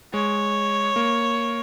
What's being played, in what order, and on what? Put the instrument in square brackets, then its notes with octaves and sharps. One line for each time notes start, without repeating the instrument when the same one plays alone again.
[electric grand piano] G#3 [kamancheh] C#5
[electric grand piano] A#3